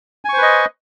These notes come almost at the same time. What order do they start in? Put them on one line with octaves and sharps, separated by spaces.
G#5 C#6 C5 B4 D#5